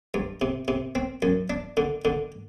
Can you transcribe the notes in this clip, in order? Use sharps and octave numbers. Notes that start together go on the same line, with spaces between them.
G2
C3
C3
C4
F#2
D4
D3
D3